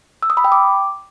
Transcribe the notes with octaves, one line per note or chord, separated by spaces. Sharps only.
E6
D#6
B5
G5
D6